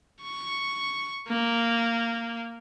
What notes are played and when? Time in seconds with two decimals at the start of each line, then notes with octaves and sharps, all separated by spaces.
0.22 C#6
1.28 A#3